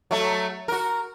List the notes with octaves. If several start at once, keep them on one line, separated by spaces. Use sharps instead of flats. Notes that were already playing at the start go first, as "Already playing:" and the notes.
F#3 A3
F#4 A#4